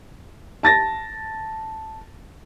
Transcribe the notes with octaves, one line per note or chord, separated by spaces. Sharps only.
A5 A6 A#6